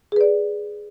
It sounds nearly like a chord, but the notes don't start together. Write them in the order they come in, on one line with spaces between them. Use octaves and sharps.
G#4 B4 D5